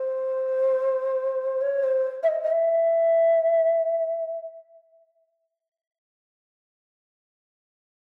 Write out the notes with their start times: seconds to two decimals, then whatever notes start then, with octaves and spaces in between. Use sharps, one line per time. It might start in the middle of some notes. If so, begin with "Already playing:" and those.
Already playing: C5
1.61 C#5
1.83 C5
2.23 E5
2.28 D#5
2.43 D#5
2.51 E5